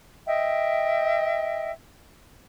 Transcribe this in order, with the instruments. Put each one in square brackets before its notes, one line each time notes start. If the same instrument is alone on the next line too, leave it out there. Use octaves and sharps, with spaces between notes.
[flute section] D#5 E5 G5